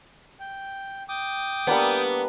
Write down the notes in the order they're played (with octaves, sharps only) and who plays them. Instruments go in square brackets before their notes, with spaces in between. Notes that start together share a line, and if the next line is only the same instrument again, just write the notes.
[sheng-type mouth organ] G5
G5 D6 D#6
[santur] G3 A#3 D4 [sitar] B3